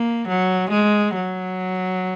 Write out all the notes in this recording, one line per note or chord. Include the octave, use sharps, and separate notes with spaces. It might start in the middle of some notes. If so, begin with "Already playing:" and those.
Already playing: A#3
F#3
G#3
F#3